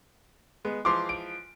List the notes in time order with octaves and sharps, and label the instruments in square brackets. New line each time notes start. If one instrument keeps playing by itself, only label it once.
[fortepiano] G#3 B3
[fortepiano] E3 F3 G#3 [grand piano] C6 D6
[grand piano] D7